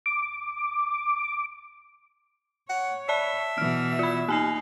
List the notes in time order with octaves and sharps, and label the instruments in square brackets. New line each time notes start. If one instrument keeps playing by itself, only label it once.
[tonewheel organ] D6
[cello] C#5 [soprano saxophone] F#5
[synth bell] D5 A5 [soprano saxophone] E5
[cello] B2 E3 [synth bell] F6
[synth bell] F4 B5
[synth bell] A#3 G#5 C7 [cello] D#4